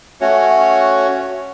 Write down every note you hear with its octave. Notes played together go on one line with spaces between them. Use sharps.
A3 C#4 F#4 C#5